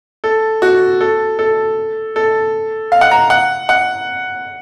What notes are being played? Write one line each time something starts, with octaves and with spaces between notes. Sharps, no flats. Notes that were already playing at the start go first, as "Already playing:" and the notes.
A4
F#4
A4
A4
A4
F5
F#5
A#5
F#5
F#5